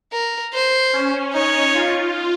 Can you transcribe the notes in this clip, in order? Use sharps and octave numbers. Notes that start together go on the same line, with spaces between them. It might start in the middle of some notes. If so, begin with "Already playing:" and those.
A#4
C5
C#4
D#4 C#5
F4